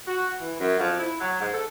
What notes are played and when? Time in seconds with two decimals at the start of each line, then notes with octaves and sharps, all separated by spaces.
0.06 F#4
0.40 E3
0.60 F#2
0.79 F2
0.99 E4
1.20 F#3
1.41 G#2
1.53 A4